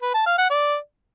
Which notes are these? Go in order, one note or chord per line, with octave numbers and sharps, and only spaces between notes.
B4
A5
F5
F#5
D5